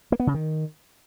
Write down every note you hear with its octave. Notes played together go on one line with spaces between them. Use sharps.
A#3
B3
C#3
D#3